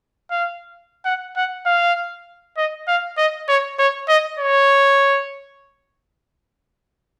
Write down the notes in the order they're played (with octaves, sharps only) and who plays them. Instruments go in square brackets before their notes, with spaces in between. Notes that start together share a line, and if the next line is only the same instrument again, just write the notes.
[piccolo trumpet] F5
F#5
F#5
F5
D#5
F5
D#5
C#5
C#5
D#5
C#5